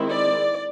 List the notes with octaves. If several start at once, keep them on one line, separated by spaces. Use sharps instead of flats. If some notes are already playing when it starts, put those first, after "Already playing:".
Already playing: D#3 G#3 C4 E4
D5